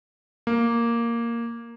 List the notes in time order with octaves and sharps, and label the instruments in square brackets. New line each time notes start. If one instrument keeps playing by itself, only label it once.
[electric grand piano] A#3